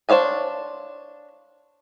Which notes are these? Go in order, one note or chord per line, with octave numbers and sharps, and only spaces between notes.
D4 C5 C#5 F5 G#5